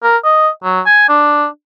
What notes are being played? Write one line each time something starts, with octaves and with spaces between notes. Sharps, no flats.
A#4
D#5
F#3
G#5
D4